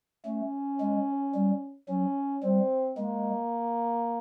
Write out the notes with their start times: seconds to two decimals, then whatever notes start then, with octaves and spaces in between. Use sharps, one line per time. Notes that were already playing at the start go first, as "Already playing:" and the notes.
0.25 A3 C#4
0.80 G#3
1.35 G3
1.88 F#3 C#4
2.43 G3 C4
2.97 G#3 A#3